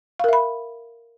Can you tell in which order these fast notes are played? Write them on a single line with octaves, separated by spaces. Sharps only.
F5 A#4 E5 B5